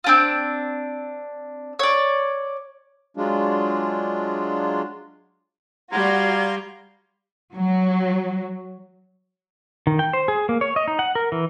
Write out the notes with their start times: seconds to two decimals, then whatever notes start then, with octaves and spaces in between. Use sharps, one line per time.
0.04 C4 D4 F4
1.79 C#5 D5
3.17 F#3 G#3 D4 F4
5.92 G3 F#4 D5 F5 A#5 C6 G#6
7.55 F#3
9.87 D#3
9.99 G5
10.13 C5
10.28 G#4
10.49 A#3
10.61 C#5
10.76 D#5
10.88 D#4
10.99 F#5
11.15 A#4
11.32 E3